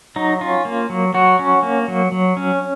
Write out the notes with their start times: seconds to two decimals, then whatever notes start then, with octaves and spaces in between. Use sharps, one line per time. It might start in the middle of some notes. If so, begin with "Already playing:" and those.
0.16 F#3 D#4
0.41 C#4 F4
0.65 A#3
0.90 F#3
1.14 F#3 F#4
1.39 C#4
1.63 A#3
1.88 F#3
2.12 F#3
2.37 C#4